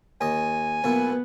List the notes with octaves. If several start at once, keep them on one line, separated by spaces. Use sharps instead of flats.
D#2 D#5 G#5
B1 A#2 B3 E4